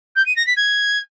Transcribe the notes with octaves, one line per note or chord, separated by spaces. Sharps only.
G6
D#7
A#6
B6
G#6